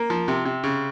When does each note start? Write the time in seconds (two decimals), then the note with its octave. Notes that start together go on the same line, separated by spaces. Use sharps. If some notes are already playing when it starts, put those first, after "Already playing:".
Already playing: A#3
0.10 F3
0.28 C3
0.45 C3
0.64 C#3